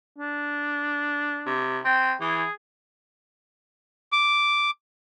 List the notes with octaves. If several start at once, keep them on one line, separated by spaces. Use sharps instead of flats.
D4
C3
C4 G5
E3 G#4
D6